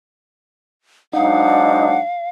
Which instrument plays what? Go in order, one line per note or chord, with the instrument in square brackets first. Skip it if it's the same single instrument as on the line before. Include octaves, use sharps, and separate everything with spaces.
[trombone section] G#2 F#3 D4 [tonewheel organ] D#4 [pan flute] F5 [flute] F#5